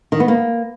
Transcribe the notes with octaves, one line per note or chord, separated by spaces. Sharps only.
D#3
B3
A#3